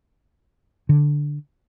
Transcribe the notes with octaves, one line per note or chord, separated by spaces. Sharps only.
D3